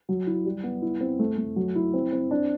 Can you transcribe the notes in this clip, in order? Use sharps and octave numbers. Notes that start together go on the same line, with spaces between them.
F#3
E4
G3
B3
E4
C4
A3
A3
F#3
E4
C4
C4
D4